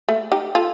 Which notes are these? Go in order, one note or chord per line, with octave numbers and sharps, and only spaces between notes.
A3
D#4 G4
F4 A4